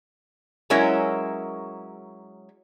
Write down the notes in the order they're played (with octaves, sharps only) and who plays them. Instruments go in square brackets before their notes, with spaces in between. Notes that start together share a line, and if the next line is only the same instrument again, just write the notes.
[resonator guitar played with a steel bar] F#3 G#3 C#4 E4 A#4